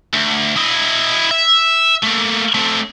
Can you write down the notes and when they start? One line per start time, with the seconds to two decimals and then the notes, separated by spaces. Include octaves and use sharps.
0.14 D2
0.56 E4 D#5
1.31 E5
2.03 A3 A#3
2.55 A3 C4